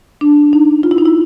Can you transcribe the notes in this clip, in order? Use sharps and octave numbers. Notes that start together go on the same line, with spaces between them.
D4
D#4
F4
E4
D#4
E4